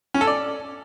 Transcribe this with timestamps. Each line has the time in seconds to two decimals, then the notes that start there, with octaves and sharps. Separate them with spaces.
0.14 C#4
0.21 A4
0.27 D5